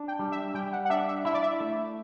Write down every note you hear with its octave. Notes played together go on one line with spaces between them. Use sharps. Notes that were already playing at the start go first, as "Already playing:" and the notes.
Already playing: D4
G5
G3
E5
G3 G5
F#5
F#5
D4 E5
E5
E4 E5
D5
E5
A3